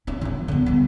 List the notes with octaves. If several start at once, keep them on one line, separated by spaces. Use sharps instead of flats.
C#4 E4
G2 D#3
D3 B3
G3 B3